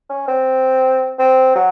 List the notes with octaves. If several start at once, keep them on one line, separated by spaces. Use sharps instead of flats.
C#4
C4
C4
F#3